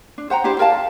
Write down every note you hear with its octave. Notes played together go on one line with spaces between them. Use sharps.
D4
C5 F#5 G5 A#5
D4 E4 G4 C5
A#4 D5 F5 A5
A5